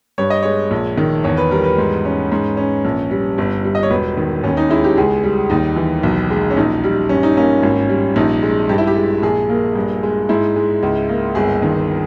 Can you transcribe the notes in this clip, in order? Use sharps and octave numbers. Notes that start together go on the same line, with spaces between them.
G2 C#5
D#5
G#3 C#5
A#1
D#3
E2 C#5
B4
G3 A#4
B4
G#2
C#4
G#2
C#4
A#1
G3
G1
G3
D#5
C#5
E1 B4
D#3
D#2 C#4
D#4
G#3 E4
G4
C#2 G#4
G3
D#2 D#4
E3
B1
G#3
C#4
A#1 D#4
G3
G2 C#4
D#4
A#3 C#4
G#1
G3
A#1 D#4
G#3
G2 G4
E4
G4
G#3
A#1 G#4
A#3
G2
G#3
G#2 E4
G#3
C#2
A#3
G1 G#4
D#3